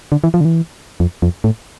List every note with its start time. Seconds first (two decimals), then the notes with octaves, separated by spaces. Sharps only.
0.12 D3
0.24 E3
0.34 F3
0.41 D3
0.45 E3
1.00 F2
1.22 F2
1.44 A2